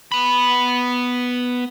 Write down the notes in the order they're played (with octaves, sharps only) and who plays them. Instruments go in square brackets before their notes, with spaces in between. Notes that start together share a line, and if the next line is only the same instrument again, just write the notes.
[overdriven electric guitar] B3 B5